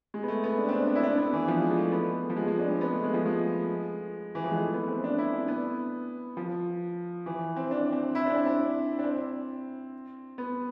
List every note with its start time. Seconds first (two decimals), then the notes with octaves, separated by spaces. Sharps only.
0.14 G#3
0.23 B3
0.28 A3
0.44 B3
0.58 D4
0.68 C4
0.73 D4
0.88 D4
0.95 E4
1.03 D4
1.17 B3
1.33 E3
1.48 F3
1.62 G#3
1.77 A3
1.92 B3
2.30 F3
2.36 G#3
2.48 G#3
2.59 D4
2.70 C4
2.81 B3
2.92 A3
3.04 G#3
3.14 F3
3.26 G#3
4.35 E3
4.44 F3
4.51 G#3
4.60 A3
4.74 B3
4.88 C4
5.04 D4
5.18 E4
5.34 D4
5.48 B3
6.37 F3
7.26 E3
7.56 C4
7.71 D4
7.92 C4
8.15 E4
8.26 D4
8.36 C4
8.46 D4
8.99 D4
9.04 C4
10.38 B3